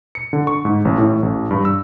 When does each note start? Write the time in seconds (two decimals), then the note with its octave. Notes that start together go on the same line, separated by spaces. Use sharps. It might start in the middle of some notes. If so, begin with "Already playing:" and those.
0.15 C#7
0.33 D3
0.47 C#6
0.65 G#2
0.85 A1
0.98 A2
1.23 A1
1.51 G2
1.65 E6